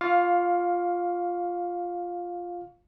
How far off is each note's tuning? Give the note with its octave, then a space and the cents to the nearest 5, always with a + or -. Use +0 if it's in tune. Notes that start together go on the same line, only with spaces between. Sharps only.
F4 +0 F5 +15 C#6 +30